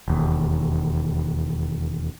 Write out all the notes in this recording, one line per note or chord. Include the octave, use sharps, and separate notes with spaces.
E1 D#2